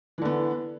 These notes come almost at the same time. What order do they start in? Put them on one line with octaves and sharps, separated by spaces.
E3 D3 B3